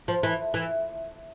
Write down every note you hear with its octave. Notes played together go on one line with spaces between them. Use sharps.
F3
E3
E3